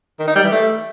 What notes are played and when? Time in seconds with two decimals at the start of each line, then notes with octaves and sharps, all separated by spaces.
0.19 D#3
0.27 D#4
0.36 G3
0.44 E3
0.52 A3